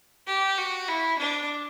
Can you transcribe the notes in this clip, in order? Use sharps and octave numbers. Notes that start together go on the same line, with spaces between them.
G4
F#4
E4
D4